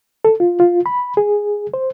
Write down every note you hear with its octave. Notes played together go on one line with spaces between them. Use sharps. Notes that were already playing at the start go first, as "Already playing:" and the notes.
A4
F4
F4
B5
G#4
C5